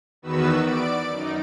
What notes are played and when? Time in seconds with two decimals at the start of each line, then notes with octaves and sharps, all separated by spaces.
0.22 E2 D#3 B3 F#4 B4 E6
0.61 D5 D7
1.10 F#2 D#4